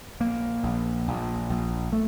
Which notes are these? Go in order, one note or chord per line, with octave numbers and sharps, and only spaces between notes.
A#1 A#3
A#1
A#1
A#1
A3